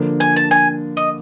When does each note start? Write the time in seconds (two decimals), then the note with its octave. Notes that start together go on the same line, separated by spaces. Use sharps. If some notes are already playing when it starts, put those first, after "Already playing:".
Already playing: D3 F3 A#3 D4
0.20 G#5
0.36 A5
0.51 G#5
0.97 D#5